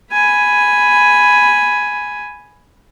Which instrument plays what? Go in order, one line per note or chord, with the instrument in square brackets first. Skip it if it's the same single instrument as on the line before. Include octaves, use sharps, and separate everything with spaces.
[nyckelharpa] G#5 B5